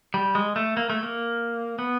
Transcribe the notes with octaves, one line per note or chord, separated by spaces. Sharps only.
G3
G#3
A3
A#3
A3
A#3
B3